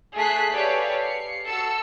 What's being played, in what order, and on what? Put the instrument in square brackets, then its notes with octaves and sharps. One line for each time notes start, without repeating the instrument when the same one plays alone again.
[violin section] A3 G#4 F#6 B6 C7
G4 A4 B4 C#5 D5 F5
C7 C#7
F#4 A4 E6 C#7